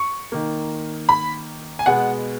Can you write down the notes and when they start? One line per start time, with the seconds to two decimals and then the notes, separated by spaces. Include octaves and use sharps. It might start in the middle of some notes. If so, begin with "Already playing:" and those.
Already playing: C#6
0.32 D#3 A#3
1.09 B5
1.79 G#5
1.86 B2 G#3 B3 F#5